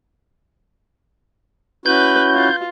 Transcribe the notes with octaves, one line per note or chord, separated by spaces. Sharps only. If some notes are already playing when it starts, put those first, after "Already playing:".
C#4 E4 F#4 B4 G6
F4